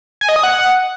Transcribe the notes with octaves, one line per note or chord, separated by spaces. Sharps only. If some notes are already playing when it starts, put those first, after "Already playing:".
G#5
D#5
D#6
F#5